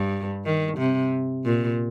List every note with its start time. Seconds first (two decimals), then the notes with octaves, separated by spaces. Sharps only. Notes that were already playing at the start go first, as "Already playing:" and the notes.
Already playing: G2
0.46 D#3
0.78 C3
1.45 A#2